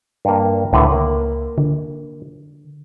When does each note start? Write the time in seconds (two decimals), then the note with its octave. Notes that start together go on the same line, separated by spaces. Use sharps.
0.25 G2 A#3
0.73 C#2 A2 D3 B4
0.92 A#3
1.58 D3